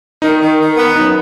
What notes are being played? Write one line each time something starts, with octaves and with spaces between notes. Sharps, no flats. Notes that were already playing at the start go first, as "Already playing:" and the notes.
D#3 D#4
D#3
D#3
B3
F#2 D#4